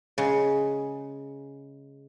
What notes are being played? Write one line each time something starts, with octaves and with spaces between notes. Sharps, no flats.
C#3 G#3